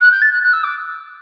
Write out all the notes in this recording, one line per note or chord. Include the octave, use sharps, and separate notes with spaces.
F#6
G6
A6
F#6
F#6
E6
D6